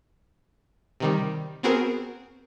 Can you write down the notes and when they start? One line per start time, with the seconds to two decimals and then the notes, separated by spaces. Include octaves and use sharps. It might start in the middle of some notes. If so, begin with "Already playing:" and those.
1.00 C3 D#3 G3
1.63 B3 C4 F#4 G#4 A#4